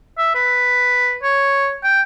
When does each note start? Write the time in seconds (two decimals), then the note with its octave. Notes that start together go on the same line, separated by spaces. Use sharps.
0.18 E5
0.35 B4
1.23 C#5
1.84 G5